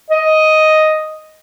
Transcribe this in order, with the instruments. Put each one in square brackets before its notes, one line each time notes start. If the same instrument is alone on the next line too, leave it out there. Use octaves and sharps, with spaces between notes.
[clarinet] D#5